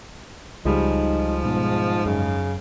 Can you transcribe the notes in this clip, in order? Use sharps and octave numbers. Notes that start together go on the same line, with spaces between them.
C#2 F3 G3 G#3 D#4
G#2 B2
F#2 C#3